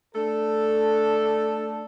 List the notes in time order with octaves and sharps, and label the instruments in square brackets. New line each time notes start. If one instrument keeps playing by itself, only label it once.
[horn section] A3 D4 A4